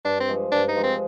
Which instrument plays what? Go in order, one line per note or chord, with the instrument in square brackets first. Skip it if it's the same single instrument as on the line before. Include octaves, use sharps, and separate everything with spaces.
[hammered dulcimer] G2 [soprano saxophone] D4
[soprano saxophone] C4
[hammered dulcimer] F3 G#3
[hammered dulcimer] G2 [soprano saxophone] D4
[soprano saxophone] D#4
[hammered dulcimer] F3 G#3
[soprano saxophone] C4